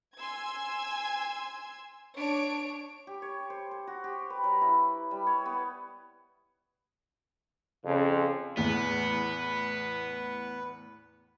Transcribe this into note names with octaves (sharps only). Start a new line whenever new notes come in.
G#5 C6 E6 G#6
D4 C#5 D7
G4
C#5
C5
C5
F#4
G4
B4
F#3
E4
G3
C#5
B3
F2 C#3
E2 A2 B3 B4